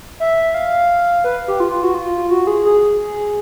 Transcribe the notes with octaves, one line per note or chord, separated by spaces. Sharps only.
E5
F5
B4
G4
F4
F4
F#4
F4
F#4
G#4
G#4